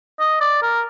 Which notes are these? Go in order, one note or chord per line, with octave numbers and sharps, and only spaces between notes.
D#5
D5
A#4